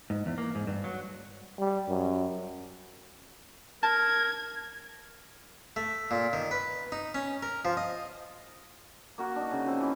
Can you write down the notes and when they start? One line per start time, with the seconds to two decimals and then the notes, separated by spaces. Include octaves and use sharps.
0.10 G#2
0.26 E2
0.38 A#3
0.55 G#2
0.67 G2
0.84 F#3
1.59 G3
1.88 F#2
3.83 A#4 A5 G#6
5.76 A3
6.11 A#2
6.33 D#3
6.51 B4
6.92 D#4
7.15 C#4
7.43 A#4
7.65 F3
7.77 D#5
9.18 A#3 F#4 A#4
9.36 D4 D#4
9.51 C#3
9.66 F3 C4
9.81 E3 C#4